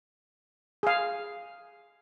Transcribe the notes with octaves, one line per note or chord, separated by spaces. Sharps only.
G#4 F5